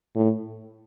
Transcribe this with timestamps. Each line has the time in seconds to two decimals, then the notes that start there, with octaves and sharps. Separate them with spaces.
0.15 A2